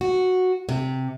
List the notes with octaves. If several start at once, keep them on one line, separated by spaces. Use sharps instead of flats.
F#4
C3